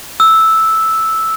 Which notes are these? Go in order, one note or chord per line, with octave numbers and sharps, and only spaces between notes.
E6